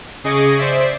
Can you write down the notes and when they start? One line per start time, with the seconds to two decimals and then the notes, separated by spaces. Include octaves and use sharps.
0.24 C#3 G#4 D#5 C#6 D6
0.58 C5 D5 E5